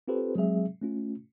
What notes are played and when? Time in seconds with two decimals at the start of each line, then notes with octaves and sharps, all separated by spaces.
0.08 C4 F4 G4 A4 B4 C5
0.35 F#3 G#3 C4 G#4 E5
0.82 A3 C#4 F4